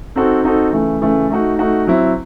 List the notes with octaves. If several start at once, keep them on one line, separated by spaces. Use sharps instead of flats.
C4 D#4 F#4 A4
C4 D#4 F#4 A4
C#3 E3 A3
C#3 E3 A3
A3 D#4 F#4
A3 D#4 F#4
F#3 C4 E4